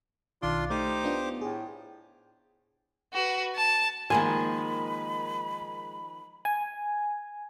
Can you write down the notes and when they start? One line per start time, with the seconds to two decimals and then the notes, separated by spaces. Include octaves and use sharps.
0.42 B1 D#3 D4 F4 C6 D6
0.70 A3 D#4 G4 C5 D6
1.04 B3 D4 F4
1.41 A2 G#4
3.14 F#4 B4
3.56 A5
4.10 D#3 F3 G#3 A#3 G#5 B5
6.45 G#5